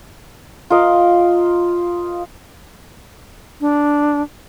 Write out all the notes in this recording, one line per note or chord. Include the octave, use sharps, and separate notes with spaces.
F4 A#4 D#5
D4